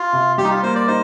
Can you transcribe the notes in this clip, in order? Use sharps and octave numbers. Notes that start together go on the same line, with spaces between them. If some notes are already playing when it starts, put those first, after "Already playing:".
Already playing: F4
C3
G3 G4
D#4
F4
A#3 C5
D5
D#4 C5